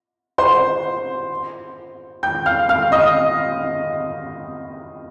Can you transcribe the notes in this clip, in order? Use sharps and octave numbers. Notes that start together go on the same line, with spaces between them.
C5 C6
G5 G6
F5 F6
F5 F6
D#5 D#6